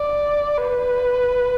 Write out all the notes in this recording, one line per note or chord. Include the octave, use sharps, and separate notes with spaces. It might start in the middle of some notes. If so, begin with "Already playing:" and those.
Already playing: D5
B4